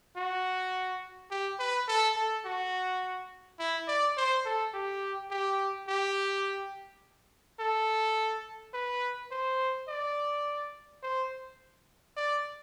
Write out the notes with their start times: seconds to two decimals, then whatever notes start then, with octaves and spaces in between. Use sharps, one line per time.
0.16 F#4
1.31 G4
1.59 B4
1.88 A4
2.16 A4
2.45 F#4
3.59 E4
3.88 D5
4.17 C5
4.45 A4
4.74 G4
5.31 G4
5.88 G4
7.60 A4
8.74 B4
9.31 C5
9.88 D5
11.03 C5
12.17 D5